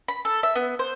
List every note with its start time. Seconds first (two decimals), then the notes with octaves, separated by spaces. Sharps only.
0.08 B5
0.25 A4
0.43 E5
0.55 B3
0.79 C5